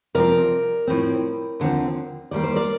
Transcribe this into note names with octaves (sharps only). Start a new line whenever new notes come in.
C3 F3 C4 A#4 D5
A2 F3 C4
D#2 D3 F3 C4
D#2 D#3 G3 A#3 D5
C5
A#4 D5